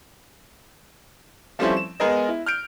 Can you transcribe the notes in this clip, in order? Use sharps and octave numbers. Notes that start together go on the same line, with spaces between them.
F3 G3 A3 C4 C#4 E4
E7
G#3 B3 G#4 A#4 D#5
E4
F6 G6 D7